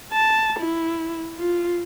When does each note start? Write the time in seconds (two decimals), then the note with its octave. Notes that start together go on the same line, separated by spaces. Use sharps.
0.12 A5
0.59 E4
1.38 F4